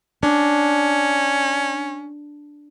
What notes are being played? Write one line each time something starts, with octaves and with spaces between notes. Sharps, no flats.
C#4 D4